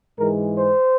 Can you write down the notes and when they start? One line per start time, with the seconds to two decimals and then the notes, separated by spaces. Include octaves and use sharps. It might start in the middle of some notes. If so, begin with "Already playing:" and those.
0.18 G#2 E3 G#3 A#4
0.57 C5